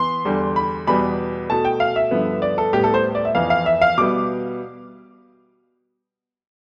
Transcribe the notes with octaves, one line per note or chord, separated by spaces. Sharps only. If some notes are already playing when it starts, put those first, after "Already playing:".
Already playing: E3 B3 C6
E2 D3 G3
B5
E2 B2 G3 B3 B5
B2 A3 A5
G5
F5
E5
G2 D3 F3 B3
D5
A4
A2 G3 B3 G4
A4
C5
D5
E5
F2 E3 B3 F5
F5
E5
F5
B2 G3 B3 D6